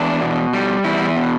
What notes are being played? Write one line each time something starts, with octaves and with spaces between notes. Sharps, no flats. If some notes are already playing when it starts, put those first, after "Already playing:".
Already playing: E2 D4
B2
G3
E2 E4
B2